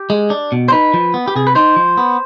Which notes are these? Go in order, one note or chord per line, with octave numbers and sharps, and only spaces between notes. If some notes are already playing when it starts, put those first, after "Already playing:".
Already playing: G4
G#3
D4
B2
C5
D#4 B4
F3
B3
G4
C3 G#4
B4
D#4 C5
F3
B3